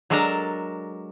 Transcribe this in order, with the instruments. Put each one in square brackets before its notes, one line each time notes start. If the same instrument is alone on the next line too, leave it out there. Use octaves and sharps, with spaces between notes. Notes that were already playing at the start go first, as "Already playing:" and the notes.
[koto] F#3 G#3 D4 A4 A#4 A#5